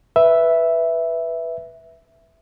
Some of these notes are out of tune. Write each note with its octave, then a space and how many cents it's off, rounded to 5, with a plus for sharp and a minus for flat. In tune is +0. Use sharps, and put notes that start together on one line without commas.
B4 +0 E5 +0